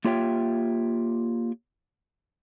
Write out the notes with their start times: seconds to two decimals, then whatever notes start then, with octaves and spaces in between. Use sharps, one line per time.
0.05 A#3 F4 G4 C#5 E5 G5